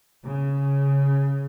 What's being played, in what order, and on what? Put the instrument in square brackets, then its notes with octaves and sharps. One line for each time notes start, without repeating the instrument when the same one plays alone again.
[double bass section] C#3